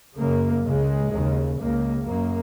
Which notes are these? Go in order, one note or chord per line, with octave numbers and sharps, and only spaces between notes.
F#2 C#3 A#3
C#2 C#3 G#3
D#2 C#3
C#2 C#3 A#3
F#2 C#3 A#3